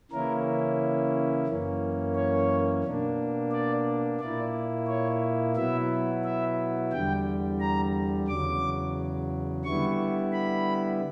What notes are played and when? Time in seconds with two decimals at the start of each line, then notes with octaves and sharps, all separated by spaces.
0.12 C#3 E3 A#3 C#4 E4 A#4
1.47 F#2 E3 A#3 C#4
2.15 C#5
2.84 B2 A#3 D4
3.52 D5
4.20 A#2 A#3 E4 D5
4.88 C#5
5.56 B2 F#3 B3 E4 E5
6.24 E5
6.92 E2 D3 G3 G5
7.60 A#5
8.28 E2 C#3 F#3 D6
9.64 D3 G3 B3 E4 C#6
10.32 B5